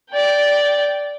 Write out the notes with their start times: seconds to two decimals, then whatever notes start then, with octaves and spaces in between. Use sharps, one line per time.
0.11 D5 G5